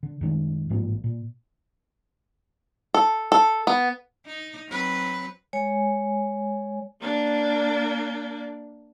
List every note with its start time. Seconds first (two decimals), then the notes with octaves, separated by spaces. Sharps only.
0.03 D3
0.21 F#2 D#3 G#3
0.69 A1 G#2 F3 A#3
1.04 A#2
2.94 A4
3.32 A4
3.67 B3
4.26 D#4
4.69 F#3 C4 B4
5.53 G#3 C#5 G#5
7.00 A#3 D4